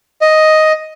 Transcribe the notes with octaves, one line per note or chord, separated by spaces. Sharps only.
D#5